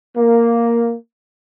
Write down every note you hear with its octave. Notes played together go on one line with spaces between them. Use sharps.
A#3